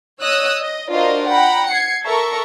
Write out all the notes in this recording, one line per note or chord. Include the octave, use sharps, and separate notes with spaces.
C#5 D#5 D#6 E6 F#6
D#5
D4 F4 F#4 A#4 C5 D#5
F#5 G5 A#5 B5
G#6 C7 C#7
A4 A#4 E5 A#5 C#6